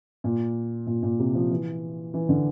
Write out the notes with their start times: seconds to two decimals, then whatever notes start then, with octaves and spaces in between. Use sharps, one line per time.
0.24 A#2
0.87 A#2
1.03 A#2
1.19 C3
1.35 F3
1.50 E3
2.14 E3
2.29 D3